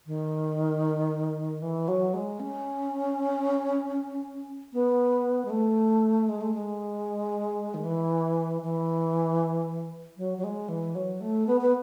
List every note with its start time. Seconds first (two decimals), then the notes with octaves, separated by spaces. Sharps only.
0.06 D#3
1.62 E3
1.88 F#3
2.14 G#3
2.40 C#4
4.73 B3
5.45 G#3
5.50 A3
6.29 G#3
6.41 A3
6.54 G#3
7.74 D#3
7.84 E3
8.62 E3
10.17 F#3
10.38 F#3
10.44 G#3
10.69 E3
10.95 F#3
11.21 A3
11.47 B3
11.61 B3